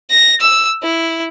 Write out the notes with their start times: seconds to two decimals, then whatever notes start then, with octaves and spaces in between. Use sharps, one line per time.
0.10 A#6
0.41 E6
0.83 E4